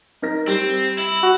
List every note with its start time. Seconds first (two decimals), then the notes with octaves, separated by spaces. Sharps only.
0.22 D#4 A#4 A#6
0.48 G3 C4
0.98 E4
1.23 F#4